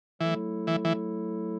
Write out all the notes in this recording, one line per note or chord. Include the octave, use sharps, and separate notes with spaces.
E3 F#3 A3 E4 A4
E3
E3